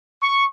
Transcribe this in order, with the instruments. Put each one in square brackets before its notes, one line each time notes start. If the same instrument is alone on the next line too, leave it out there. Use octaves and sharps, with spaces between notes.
[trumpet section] C#6